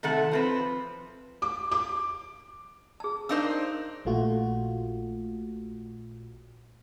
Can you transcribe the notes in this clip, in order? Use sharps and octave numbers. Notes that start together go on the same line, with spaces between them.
C3 D#3 A3 A4 F#5
F3 C4 B4
D6
D6
G#4 A5
D4 D#4 A#4 C5 F5 E6
A#1 A#2 A3 F4 F#4